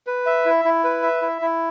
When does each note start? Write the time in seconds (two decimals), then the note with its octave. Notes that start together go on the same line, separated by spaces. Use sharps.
0.07 B4
0.26 E5
0.45 E4
0.65 E4
0.84 B4
1.03 E5
1.22 E4
1.42 E4